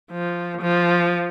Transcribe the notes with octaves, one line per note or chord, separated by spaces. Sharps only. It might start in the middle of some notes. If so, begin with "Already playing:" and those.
F3
F3